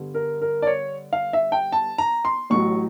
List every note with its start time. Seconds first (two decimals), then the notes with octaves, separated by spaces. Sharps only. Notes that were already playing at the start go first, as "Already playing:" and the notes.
Already playing: G2 D3 G3 B3
0.14 A#4
0.42 A#4
0.62 D5
0.67 C#5
1.13 F5
1.33 E5
1.52 G5
1.72 A5
1.98 A#5
2.25 C6
2.50 A1 A2 F#3 C#6